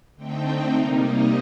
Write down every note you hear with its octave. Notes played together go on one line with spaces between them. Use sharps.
D3 A3 C4 D#4 G5
C3 G3 A#3 D#4 F5
D#5